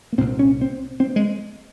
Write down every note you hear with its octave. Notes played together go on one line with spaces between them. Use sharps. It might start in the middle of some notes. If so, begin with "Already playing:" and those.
A#3
C2 A#2 C4
C#4
C4
C4
G#3